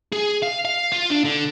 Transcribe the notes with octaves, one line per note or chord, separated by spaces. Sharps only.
G#4
F5
F5
F4
D4
D3